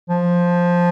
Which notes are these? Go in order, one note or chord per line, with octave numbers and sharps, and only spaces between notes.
F3